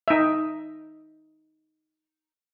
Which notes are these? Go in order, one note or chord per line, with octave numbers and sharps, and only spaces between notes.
D#4 E5